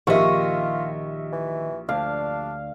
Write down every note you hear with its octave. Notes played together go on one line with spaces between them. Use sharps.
A#1 D#3 F4 G4 D#5 E5 C#6
E3
D2 D4 F5